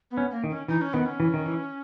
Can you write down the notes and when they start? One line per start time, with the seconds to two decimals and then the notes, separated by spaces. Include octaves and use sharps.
0.11 B3
0.17 C#4
0.31 A#3
0.44 D#3
0.50 C#4
0.68 E3 D#4
0.81 C#4
0.94 D#3 B3
1.06 C#4
1.20 E3
1.34 D#3
1.46 E3